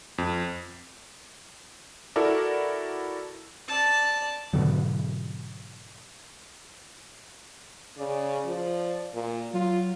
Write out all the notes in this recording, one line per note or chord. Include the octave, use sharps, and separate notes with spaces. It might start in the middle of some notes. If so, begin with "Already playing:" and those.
F2
E4 F#4 A4 A#4 D5
D5 A5
G#2 B2 D3 F#3
C#3 D5
F3
A#2
F#3 F4